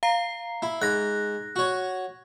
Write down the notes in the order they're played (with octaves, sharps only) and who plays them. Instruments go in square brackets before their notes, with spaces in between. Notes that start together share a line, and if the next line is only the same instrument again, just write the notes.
[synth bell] F5 A#5 C7
[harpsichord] E4
[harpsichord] G#2 [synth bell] F#6 A#6
[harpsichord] F#4 C#5